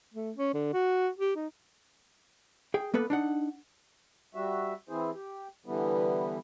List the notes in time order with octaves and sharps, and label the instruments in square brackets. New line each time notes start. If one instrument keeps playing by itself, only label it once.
[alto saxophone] A3
C#4
D3
F#4
G4
D#4
[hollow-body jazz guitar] G#4 G5
A#3 B3 A4 B4
D4 D#4 F#5
[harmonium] G3 F#4 E5
E3 C4 E4 G#4 C5
G4
D3 E3 G3 B3